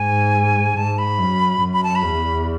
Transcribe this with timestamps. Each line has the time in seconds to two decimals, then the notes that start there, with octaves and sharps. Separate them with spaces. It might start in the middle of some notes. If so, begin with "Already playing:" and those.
Already playing: G#2 G#5
0.77 G#2 A5
0.98 B5
1.19 F#2
1.61 F#2
1.73 B5
1.84 A5
1.96 B5
2.03 E2